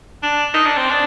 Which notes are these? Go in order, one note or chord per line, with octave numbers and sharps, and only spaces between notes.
D4
D#4
D4
C4
D4